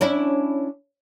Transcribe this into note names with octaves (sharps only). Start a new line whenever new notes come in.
C#4 D4 E4